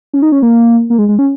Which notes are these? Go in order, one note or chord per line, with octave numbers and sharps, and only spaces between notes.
C#4
D#4
C#4
A#3
A#3
G#3
G#3
C#4